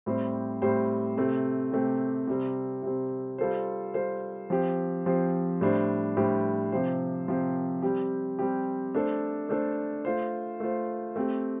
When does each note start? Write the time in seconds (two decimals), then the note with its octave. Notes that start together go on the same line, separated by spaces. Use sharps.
0.06 A2 G3 C4 G4 C5
0.62 A2 G3 C4 G4 C5
1.17 C3 A3 C4 G4
1.72 C3 A3 C4 G4
2.27 C3 G3 C4
2.83 C3 G3 C4
3.38 G3 F4 A4 C5
3.94 G3 F4 A4 C5
4.50 F3 C4 G4 C5
5.06 F3 C4 G4 C5
5.61 A2 G3 D4 G4 C5
6.17 A2 G3 D4 G4 C5
6.72 C3 F3 C4 G4 C5
7.28 C3 F3 C4 G4 C5
7.82 G3 C4 G4
8.39 G3 C4 G4
8.95 A3 D4 A4 C5
9.49 A3 D4 A4 C5
10.05 A3 F4 C5
10.60 A3 F4 C5
11.16 A3 C4 G4